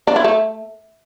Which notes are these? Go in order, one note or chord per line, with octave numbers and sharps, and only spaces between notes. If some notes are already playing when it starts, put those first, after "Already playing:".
D4
E4
A3